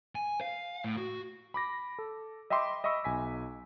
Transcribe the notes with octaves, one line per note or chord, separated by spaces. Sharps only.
G#5
F5
A2
F#4
B5 D6 A#6
A4
D#5 E5 G5 B5 C6 D6
D#5 E5 B5 C#6 E6
B1 G#5 B6